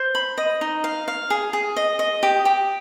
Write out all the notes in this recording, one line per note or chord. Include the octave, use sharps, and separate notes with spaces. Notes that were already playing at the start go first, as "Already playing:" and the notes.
Already playing: C5
B5
D#5
D#4
F5
F5
G#4
G#4
D#5
D#5
G4
G4